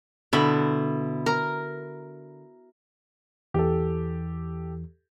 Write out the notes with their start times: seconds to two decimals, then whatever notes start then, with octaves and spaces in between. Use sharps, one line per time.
0.33 B2 D3 E4 B5
1.26 A#4 A#5
3.54 E2 E3 G4 A4